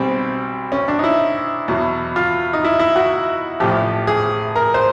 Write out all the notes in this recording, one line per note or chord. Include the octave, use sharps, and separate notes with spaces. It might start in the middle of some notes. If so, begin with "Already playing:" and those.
Already playing: B1 B2 G3 C4
C#4
D4
D#4
E4
E2 B2 F#3
F4
D#4
E4
E4
F#4
A1 A2 F3 G4
G#4
A#4
C5